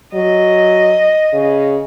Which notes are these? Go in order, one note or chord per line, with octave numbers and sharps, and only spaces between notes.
F#3 D#5
C#3